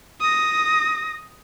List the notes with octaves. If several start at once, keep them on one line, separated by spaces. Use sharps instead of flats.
D#6 A#6